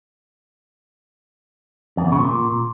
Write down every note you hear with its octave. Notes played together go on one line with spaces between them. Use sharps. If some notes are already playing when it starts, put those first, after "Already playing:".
F2
E2
C#3
A#2